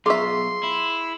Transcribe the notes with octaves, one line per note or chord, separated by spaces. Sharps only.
B1 F4 G#4 E5 C6 C#6
E4